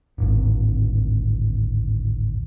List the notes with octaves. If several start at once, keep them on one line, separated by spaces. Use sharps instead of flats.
D1 G#1